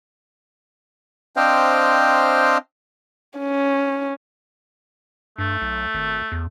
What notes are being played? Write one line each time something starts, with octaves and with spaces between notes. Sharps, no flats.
C4 D4 C5 D#5 F5 G5
C#4
G2 A3
B1
G#1
E2